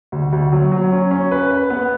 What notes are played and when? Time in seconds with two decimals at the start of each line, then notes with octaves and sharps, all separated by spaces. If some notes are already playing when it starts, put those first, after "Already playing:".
0.12 D2
0.33 D2
0.52 F#3
0.72 F#3
0.92 C#4
1.11 C#4
1.31 B4
1.51 B4
1.70 B3